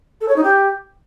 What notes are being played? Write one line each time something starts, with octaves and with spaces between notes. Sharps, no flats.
A4
C#5
D#4
G4